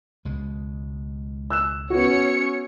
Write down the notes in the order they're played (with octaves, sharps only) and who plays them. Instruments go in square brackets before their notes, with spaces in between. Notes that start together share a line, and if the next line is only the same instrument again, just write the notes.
[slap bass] C#2 B2 G#3
[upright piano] E6 F#6 E7
[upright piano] B3 F#4 [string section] C#4 C#5 C#7